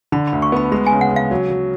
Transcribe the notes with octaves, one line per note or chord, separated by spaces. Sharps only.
D3 B5
B5
D2
C#6
B3 B5
G#3 B5
G#5
C#3
F#5
C#3
F5
F#3
F#3